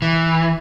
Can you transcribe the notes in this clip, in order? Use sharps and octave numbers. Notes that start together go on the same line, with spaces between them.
E3